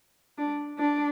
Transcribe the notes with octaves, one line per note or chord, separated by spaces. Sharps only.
D4
D4